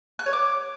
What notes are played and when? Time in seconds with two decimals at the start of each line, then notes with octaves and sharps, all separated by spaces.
0.19 F#6
0.26 C#5
0.33 D6